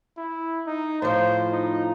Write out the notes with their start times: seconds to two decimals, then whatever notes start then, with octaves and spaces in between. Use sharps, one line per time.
0.18 E4
0.67 D#4
1.02 A2 F3 C5
1.52 D#4